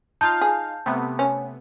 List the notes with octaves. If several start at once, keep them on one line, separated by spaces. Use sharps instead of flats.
D#4 F4 F5 A5 G6
G#4
C3 A3 B3
C#4